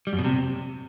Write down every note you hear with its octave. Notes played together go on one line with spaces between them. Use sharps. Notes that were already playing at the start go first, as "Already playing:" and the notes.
G3
F#2
B2
C3